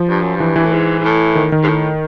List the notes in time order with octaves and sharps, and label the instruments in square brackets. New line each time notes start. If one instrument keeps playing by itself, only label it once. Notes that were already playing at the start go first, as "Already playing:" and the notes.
Already playing: [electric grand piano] F3
[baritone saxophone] G2
F#2
[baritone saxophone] G2 [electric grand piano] E3
[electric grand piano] E3
[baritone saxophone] A2
G#2
G#2
A2
[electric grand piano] D#3
D#3
[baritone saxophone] G#2
A2